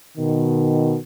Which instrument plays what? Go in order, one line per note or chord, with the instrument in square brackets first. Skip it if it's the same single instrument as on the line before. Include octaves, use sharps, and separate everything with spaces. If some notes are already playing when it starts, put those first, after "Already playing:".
[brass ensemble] B2 D#3